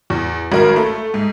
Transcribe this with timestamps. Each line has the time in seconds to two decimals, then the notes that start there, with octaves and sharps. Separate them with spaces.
0.10 E2
0.52 G#1 F#3 A#4
0.76 A3
1.14 G#2